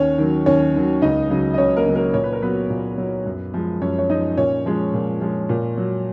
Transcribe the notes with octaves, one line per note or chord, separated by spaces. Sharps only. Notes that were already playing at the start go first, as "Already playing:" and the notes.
Already playing: D#2 C#4 C#5
D#3 F#3
D#2 C#4 C#5
D#3 F#3
C#2 D#4 D#5
C#3 F#3
D#5
C#2 C#4 C#5
A#3 A#4
C#3 F#3
A#3 A#4
A#2 C#5
B4
A#4
F#3 B3 B4
A#2
F#3
F#2
F3 G#3
F#2 C#4 C#5
C#5
F3 G#3 D#4 D#5
A#2 C#4 C#5
F3 G#3
A#2
F3 G#3
A#2
F#3